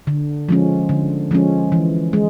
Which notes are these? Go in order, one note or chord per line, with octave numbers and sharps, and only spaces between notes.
D3
F3 G#3 C#4
D3
F3 G#3 C#4
E3
G#3